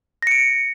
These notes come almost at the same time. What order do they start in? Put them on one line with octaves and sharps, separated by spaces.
A#6 C#7 D7